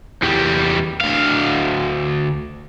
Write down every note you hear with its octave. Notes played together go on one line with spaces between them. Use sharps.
E2 G3
D2 F5